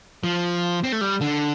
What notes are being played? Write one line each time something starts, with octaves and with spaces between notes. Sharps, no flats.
F3
C4
A3
G3
D3